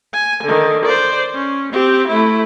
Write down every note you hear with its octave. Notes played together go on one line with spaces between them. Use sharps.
G#5
D3 D#3
C5 D5
C#4
C4 G4
A3 E4